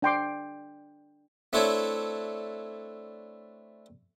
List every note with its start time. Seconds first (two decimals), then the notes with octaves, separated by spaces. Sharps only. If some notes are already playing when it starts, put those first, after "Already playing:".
0.02 D4 G5 C6 D6
1.53 A3 C4 D4 E4 A4 C#5